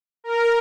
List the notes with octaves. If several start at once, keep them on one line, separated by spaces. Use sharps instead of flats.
A#4